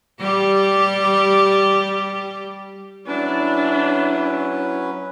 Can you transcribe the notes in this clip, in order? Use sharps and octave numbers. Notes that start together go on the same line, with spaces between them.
G3 G4
F#3 C#4 D4 E4 B4